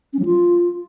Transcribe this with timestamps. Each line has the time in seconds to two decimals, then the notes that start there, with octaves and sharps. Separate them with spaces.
0.13 C#4
0.19 F#3
0.25 F4